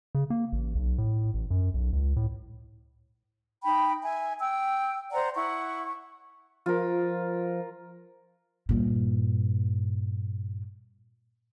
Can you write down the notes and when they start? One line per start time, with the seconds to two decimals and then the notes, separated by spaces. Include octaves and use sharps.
0.15 C#3
0.30 A#3
0.53 A1
0.75 B1
0.98 A2
1.34 A1
1.50 F#2
1.74 B1
1.93 C#2
2.16 A2
3.64 D#4 G5 B5
4.04 E5 G#5
4.39 G5 E6
5.12 C5 D5 F#5 A#5
5.34 E4 F#5 C#6
6.66 F3 F4 A#4
8.69 G2 A#2